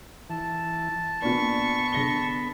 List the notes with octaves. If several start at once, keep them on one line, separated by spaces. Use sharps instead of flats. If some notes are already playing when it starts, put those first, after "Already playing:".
E3 A5
A#2 B3 D4 B5 C#6
D3 A#6 G7